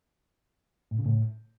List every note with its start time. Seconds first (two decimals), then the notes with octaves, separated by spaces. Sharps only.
0.91 A2
0.99 C#3
1.06 A2